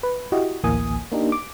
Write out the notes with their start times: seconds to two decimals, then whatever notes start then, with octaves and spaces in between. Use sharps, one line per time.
0.03 B4
0.32 E4 F#4 G4 D#5
0.64 A1 D2 E3 A#3 G#5 D#6
1.12 A#3 D4 D#4 G4
1.32 D6